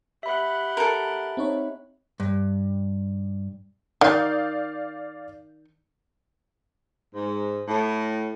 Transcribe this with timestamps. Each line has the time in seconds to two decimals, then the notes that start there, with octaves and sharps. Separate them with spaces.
0.23 G4 E5 F#5 B5
0.77 A4 A#4
1.37 C4 D#4 C#5
2.20 G2
4.01 D#3 D5 F5 G6
7.15 G#2
7.68 A2